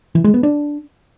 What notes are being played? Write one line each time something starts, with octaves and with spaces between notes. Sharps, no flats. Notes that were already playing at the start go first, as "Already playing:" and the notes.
E3
G#3
B3
D4